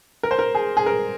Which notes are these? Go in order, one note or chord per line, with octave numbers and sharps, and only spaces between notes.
A#4
C5
A#4
G#4
G#4
A#4